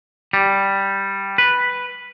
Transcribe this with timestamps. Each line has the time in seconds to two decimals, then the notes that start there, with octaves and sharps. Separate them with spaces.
0.33 G3
1.38 B4